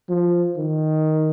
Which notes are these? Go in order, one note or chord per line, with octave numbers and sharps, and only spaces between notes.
F3
D#3